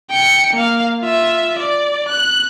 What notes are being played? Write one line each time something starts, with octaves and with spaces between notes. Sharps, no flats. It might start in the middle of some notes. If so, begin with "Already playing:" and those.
G5 C#7
A#3 F5
F4 E5
D5
F#6